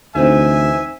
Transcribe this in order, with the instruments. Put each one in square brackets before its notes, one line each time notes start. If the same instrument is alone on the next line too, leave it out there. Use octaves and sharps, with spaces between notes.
[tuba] D2 [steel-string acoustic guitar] E3 C4 D#4 [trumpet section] E5 G#5